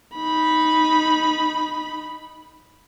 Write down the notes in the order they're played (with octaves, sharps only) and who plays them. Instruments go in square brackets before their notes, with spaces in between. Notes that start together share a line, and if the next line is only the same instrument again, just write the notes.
[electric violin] D#4 B5